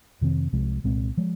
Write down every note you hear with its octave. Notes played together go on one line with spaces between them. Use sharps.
F2 C3 D#3 C4
C2 C3 F3 G#3
C2 A#2 G#3 C4
F3 G#3